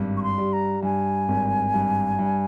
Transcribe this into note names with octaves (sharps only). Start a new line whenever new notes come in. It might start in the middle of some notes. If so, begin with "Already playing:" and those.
Already playing: G#1 G2
C#6
C6
G3
A#5
G2 G#5
G#1
G2
G2